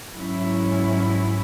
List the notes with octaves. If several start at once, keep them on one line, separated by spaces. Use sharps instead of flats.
G#2 F#3 C#4 E4